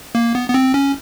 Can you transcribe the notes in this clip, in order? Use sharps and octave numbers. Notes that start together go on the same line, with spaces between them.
A#3
B3
B3
C4
C#4